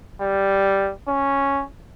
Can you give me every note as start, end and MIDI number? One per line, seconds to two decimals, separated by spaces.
0.21 0.91 55
1.08 1.64 61